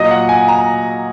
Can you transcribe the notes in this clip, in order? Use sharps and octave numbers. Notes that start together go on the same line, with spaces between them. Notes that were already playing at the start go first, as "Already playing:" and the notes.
Already playing: A#2 F#3 D#5
F#5
G#5
A#5